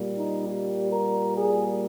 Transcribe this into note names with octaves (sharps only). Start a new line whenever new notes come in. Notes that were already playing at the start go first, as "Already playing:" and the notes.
Already playing: A#2 G3 A#3
D#4
G4
A#4
G#4